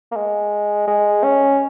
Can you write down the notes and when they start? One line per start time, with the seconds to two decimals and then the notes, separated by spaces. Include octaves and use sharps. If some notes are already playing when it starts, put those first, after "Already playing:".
0.12 A#3
0.16 G#3
0.87 G#3
1.24 C#4